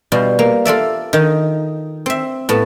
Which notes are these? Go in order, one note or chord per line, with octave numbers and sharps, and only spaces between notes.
B2 G3 F4
A#3
F4 A4 D5 E5
D#3 D#4
C4 E5
A2 B3 A5